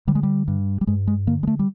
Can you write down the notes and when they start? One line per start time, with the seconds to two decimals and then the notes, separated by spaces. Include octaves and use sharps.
0.07 D3 G3
0.15 G#3
0.23 G3
0.48 G2
0.81 G3
0.87 G2 G#3
1.07 G#3
1.27 D3 A#3
1.43 G#3
1.47 A3
1.59 G3